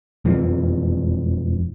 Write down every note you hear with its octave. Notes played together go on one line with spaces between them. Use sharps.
E1 F2 E3 F3